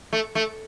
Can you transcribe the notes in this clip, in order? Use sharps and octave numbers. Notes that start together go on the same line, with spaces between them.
A3
A3